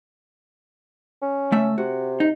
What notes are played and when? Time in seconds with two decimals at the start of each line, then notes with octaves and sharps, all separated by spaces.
1.22 C#4
1.52 C#2 A3 E5
1.78 C3 F#4
2.20 D#4